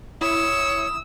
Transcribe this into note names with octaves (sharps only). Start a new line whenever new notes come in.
E4 C#5 D#6 E6